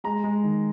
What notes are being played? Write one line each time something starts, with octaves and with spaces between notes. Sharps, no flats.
G#3 A#5
G#3
D#3